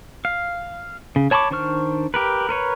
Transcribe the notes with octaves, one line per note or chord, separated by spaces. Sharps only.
F5
C#3
C#5 A5 B5 C#6 D6
D#3 D4 C5 C#6 F6
G4 A#4 B4
A#4 B4 C#5